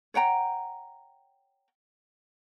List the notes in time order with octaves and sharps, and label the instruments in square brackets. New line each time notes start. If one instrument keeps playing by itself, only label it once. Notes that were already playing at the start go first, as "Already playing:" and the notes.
[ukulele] C#5 F#5 G5 A#5